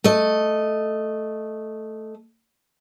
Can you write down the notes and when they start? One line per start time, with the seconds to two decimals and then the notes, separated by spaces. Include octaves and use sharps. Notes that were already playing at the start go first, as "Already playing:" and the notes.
0.04 A3 D#5